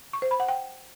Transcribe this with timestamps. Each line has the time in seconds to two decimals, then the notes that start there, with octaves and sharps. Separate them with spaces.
0.13 C#6
0.22 C5
0.31 B5
0.40 F#5
0.48 G5